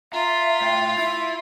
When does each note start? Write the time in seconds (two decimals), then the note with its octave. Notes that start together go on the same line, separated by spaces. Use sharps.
0.13 F4 E5 A#5
0.61 A2 G5
0.98 E4 E5 B5